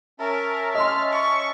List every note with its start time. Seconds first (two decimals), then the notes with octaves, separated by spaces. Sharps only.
0.19 C#4 A#4 E5 A5
0.75 D#5 C6 F6
1.12 C#6